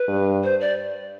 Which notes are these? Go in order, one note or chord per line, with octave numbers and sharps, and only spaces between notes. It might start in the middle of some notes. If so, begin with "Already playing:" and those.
Already playing: B4
G2
C5
D5